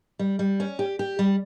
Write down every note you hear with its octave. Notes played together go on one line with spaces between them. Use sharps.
G3
G3
C#4
G4
G4
G3